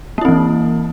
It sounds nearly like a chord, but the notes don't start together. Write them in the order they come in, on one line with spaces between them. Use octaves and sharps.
A#3 E4 C4 E3